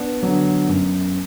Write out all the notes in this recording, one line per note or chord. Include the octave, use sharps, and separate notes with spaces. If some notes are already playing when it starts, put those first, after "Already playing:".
Already playing: B3 D4
D3 F#3
F#2